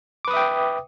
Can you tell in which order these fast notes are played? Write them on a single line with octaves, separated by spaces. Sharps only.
D6 B4 D#6 E5 G5